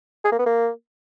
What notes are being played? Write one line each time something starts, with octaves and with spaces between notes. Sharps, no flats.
G#4
A#3
B3
A#3